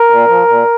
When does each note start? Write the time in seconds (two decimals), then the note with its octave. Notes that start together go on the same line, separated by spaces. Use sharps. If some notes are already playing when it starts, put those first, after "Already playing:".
Already playing: A#4
0.10 A#2
0.28 F3
0.48 A#2